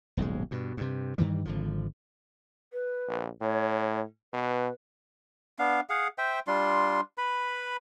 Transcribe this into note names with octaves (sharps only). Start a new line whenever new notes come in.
D#1 B1 G#2 G#3
G2 B2
G2 C3
G2 D#3 E3 G3
G#1 D3 F3
B4
A#1
A2 C#5
B2 B4
B3 D4 F5
G#4 F5 F#5
C5 E5 G5
G3 D4 F4 C6
B4 B5